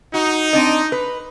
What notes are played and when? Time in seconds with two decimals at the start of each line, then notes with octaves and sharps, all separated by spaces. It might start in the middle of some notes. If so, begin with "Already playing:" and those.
0.14 D#4 F#4
0.53 C4 D4 D#5
0.92 B4